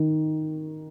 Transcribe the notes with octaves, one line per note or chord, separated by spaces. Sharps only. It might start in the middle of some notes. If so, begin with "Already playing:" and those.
Already playing: D#3